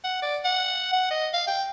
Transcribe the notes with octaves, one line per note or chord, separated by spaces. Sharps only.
F#5
D5
F#5
F#5
D#5
F5
G5